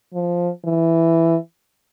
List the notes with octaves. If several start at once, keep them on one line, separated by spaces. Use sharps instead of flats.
F3
E3